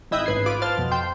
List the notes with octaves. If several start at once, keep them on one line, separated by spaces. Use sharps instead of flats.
G#1 E4 D#5 E5 G5 F#6
A1 G#2 B4 G#6 C7
F4 B4 D6
C5 F5 A5 F6 A6
F2 B2
C5 G5 C6